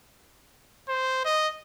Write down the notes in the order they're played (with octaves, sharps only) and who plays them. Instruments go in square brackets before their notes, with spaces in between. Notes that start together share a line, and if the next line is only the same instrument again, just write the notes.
[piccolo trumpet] C5
D#5